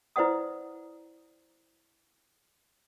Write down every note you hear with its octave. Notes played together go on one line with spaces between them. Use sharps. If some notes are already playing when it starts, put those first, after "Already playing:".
E4 B4 C5 D5 F#5 D#6